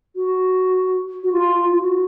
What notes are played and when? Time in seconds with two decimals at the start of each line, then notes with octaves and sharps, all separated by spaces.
0.15 F#4
1.23 F#4
1.32 F4
1.71 F4
1.79 F#4